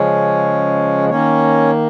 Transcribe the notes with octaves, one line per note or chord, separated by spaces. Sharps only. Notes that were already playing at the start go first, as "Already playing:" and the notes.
Already playing: C#3 F3 G#3 C#4 C#5
D#3 A#3 C#4 C#5